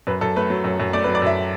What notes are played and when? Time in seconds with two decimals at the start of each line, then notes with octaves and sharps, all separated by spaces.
0.07 F#2 B4
0.21 F#2 A4
0.36 A3 B4
0.50 F#3
0.64 F#2
0.80 F#2
0.93 A3 D5
1.04 B4
1.07 F#3
1.15 D5
1.22 F#2 E5